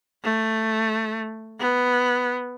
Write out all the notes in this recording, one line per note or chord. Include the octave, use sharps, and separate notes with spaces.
A3
B3